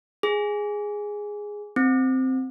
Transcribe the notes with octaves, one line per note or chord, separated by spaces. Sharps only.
G#4
C4